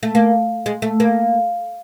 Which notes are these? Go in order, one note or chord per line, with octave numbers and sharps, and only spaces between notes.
A3
A#3
G#3
A3
A#3